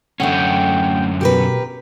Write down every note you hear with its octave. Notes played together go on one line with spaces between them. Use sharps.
F#2 D3 A3 C#4 F#5 G5
B2 G4 A#4 B4